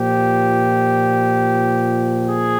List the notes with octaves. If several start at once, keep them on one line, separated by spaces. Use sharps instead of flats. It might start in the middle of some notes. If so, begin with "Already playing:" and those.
Already playing: A#2 F3 G4
G#4